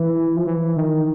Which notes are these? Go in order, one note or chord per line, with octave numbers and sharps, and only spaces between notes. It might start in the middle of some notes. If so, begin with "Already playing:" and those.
Already playing: E3
F3
E3
D#3